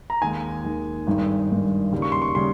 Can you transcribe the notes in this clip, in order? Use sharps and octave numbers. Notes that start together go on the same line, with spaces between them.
A#5
D#2 D#3 G#3 G#5
D#2 D#3 G#3
G#1 G2 D#3 G#3
G#1 G2 D#3 G#3
D#2 C#3 G3
C#6
C6
C#6
C#3 G3 C6